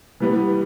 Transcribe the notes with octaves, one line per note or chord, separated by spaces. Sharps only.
E3 G3 B3